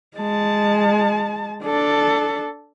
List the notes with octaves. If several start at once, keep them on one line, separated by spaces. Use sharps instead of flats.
G#3 A5
D4 A4